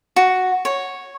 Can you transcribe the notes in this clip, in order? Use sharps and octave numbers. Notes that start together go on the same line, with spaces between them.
F#4
C#5